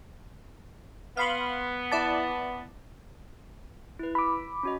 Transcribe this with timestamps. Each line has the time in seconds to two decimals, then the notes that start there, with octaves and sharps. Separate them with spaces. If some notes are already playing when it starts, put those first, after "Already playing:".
1.17 B3 F5 B5 C6
1.92 E4 D5 A5
3.99 E4 B4
4.15 B5 D6 E6
4.63 C#4 F#4 D#5